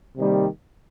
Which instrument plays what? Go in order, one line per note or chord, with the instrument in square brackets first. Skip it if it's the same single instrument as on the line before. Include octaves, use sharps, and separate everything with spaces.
[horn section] C3 D#3 G3 A#3